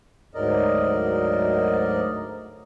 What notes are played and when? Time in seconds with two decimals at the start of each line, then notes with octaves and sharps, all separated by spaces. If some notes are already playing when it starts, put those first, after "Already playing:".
0.34 D2 G#2 F#3 A#4 D5 D#5